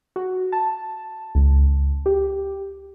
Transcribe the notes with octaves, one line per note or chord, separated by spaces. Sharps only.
F#4
A5
C#2
G4